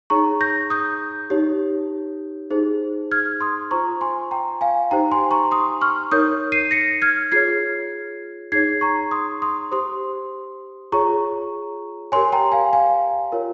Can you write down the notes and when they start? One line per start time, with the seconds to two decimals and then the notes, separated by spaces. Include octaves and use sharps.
0.10 D#4 G#4 C#5 A#5 C#6
0.41 G6 A#6
0.70 D#6 G6
1.30 D#4 G4 C#5
2.50 D#4 G#4 C5
3.11 F6 G#6
3.41 C6 D#6
3.71 F4 C5 A#5 C#6
4.01 G#5 C6
4.31 G5 A#5
4.61 F5 G#5
4.91 D#4 G4 C5 G5 A#5
5.12 G#5 C6
5.31 A#5 C#6
5.51 C6 D#6
5.81 C#6 F6
6.12 D#4 A#4 C#5 D#6 G6
6.52 C7 D#7
6.71 A#6 C#7
7.02 F6 G#6
7.32 F4 G#4 C#5 G#6 C7
8.52 D#4 G#4 C#5 G#6 C7
8.81 A#5 C#6
9.11 C6 D#6
9.42 C6 D#6
9.71 G4 C5 C6 D#6
10.92 F4 G#4 C#5 A#5 C#6
12.12 G4 A#4 C#5 G#5 C6
12.32 G5 A#5
12.52 F5 G#5
12.73 F5 G#5
13.32 F4 A#4 C#5